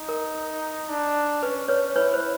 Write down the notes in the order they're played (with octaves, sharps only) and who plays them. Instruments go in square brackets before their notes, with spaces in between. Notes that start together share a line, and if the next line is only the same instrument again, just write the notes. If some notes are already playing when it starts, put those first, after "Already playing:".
Already playing: [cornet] D#4
[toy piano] A#4
[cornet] D4
[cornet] C#4 [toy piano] B4
[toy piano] B4 C#5
[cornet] E4 [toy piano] B4 C#5
[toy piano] C5